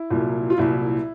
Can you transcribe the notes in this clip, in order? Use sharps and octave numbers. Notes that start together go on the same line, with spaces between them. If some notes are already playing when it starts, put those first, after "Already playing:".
Already playing: E4
C2 A#2 F#3
F4
C2 A#2 F#3 E4